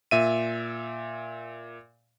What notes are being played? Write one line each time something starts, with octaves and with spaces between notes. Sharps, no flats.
A#2 E5 D#7